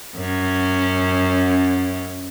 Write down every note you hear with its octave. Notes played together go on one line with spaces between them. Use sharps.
F#2 C#4